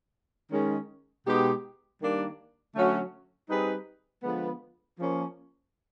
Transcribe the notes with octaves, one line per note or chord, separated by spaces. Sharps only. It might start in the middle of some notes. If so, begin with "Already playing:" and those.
D#3 G#3 C#4
B2 G#3 B3 D#4 G4
D#3 G3 A#3 D4
D3 F#3 A3 C#4 F#4
G3 C4 D#4 G#4 B4
D3 F3 G#3 B3
F3 A#3 C#4